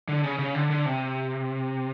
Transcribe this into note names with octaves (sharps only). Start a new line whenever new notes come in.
D3
C#3
C#3
D3
D3
C3